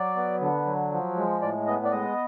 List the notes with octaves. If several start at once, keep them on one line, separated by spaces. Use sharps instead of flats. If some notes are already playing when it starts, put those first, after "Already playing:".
Already playing: F#3 D5
B3
D3
F#3
F3
G#3
A2 D5
B3 D#5
D5
G#3 D#5